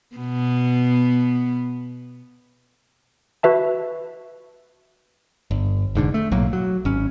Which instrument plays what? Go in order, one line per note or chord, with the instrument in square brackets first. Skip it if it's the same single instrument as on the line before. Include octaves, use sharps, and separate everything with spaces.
[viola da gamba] B2 B3
[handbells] F#4 B4 E5 A5
[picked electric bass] G1
F1 G#2 D3
A3
B1 A2 F#3 A#3
F#3
G#1 C#4